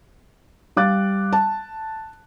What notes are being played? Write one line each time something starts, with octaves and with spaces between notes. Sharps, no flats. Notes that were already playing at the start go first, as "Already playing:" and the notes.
G3 F5 D6 F#6 A6
A5